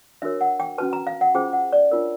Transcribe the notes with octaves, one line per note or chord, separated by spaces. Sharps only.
D4 F#4 A#4 C#5 E5
F#5
G5
C#4 F#4 B4 A5
A#5
F5
F#5
C#4 F4 G#4 C5 G5
F#5
D5
D4 F4 A#4 C#5